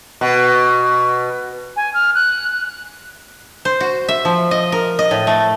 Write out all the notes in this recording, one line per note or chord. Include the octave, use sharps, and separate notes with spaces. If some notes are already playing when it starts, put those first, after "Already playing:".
B2
G#5
F6
F#6
C5
F#4
E5
F3
D#5
A#4
D#5
A2
A3